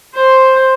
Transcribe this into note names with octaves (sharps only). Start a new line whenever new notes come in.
C5